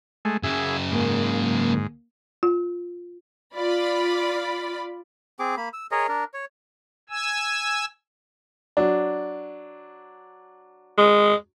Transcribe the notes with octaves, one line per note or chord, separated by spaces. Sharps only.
G#3 A3
F#2 C#3 G#4 E5
G#2 A#3
F4
F4 D5 B5
C4 G#4 D6
A#3 B5
E6
G#4 A#4 C#5 D#5
D4 A#4
C#5
G#5 E6
F#3 D4
G#3